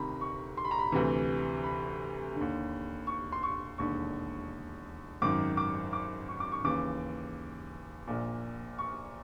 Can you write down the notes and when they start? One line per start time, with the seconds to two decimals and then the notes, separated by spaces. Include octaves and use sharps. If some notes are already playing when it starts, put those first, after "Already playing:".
Already playing: D2 C3 D#3 A#5 B5
0.21 C#6
0.57 C6
0.64 B5
0.71 A#5
0.79 B5
0.92 D2 C3 E3
1.64 B5
2.35 D3
2.41 D#2
3.07 C#6
3.32 C6
3.43 C#6
3.78 E1 D#2 D3 C#6
5.22 G#1 F#2 D#3 D6
5.57 D6
5.93 D6
6.29 C#6
6.40 D6
6.52 C#6
6.64 D#2 C#3 E3 D6
8.07 A#1 A#2
8.79 C#6